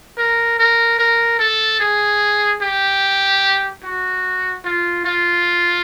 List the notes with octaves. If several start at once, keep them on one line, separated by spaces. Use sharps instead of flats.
A#4
A#4
A#4
A4
G#4
G4
F#4
F4
F4